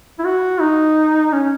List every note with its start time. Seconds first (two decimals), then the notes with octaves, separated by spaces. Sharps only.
0.19 E4
0.25 F#4
0.60 D#4
1.32 C#4